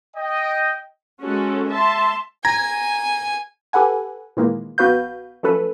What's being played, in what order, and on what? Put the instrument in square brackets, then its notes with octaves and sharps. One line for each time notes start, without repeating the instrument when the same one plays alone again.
[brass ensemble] D#5 G5
[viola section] G#3 C#4 F#4 A4
E5 A5 C6
[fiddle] G#5 [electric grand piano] A#5 G#6 A#6
[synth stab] G4 A4 B4 F#5 G#5
A#2 D#3 E3 G#3 A#3
A#1 B3 F#4 B4 F5 G6
F3 F#3 A3 C#4 A4 B4